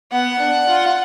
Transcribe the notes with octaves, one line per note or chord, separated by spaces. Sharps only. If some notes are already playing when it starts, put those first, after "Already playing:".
B3 F#5
D4
F4